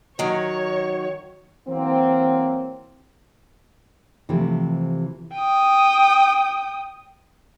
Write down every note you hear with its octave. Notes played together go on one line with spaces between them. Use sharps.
D#3 F#3 C#5
E3 F#3 A#3 C4
C3 E3 F3 A3 G4
G5 D#6